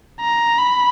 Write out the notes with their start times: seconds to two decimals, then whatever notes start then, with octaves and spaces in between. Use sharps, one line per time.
0.21 A#5
0.58 B5